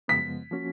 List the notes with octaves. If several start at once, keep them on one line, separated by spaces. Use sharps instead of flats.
F#2 C#3 F3 G#3 B3 B6
F3 A#3 C#4 F#4